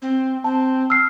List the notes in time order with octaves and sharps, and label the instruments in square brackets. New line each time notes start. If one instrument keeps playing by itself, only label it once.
[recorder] C4
[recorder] C4 [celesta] A5
[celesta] E6 F6 C7